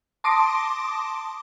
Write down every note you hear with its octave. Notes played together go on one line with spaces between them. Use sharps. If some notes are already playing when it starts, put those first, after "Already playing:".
A5 C6 D6 D#6 A#6 D7